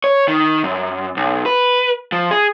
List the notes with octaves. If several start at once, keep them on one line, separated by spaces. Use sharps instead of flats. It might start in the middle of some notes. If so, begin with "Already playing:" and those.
C#5
D#3
F#2
B1
B4
F3
G#4